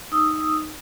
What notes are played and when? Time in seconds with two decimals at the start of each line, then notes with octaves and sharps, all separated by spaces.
0.12 D#4 D#6 E6